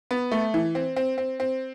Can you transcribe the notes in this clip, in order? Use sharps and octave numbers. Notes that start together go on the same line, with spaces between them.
B3
A3
E3
C4
C4
C4
C4